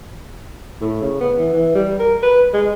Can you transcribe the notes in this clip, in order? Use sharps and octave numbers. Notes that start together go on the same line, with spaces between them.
A2
C#3
B3
E3
E3
G3
A#4
B4
G#3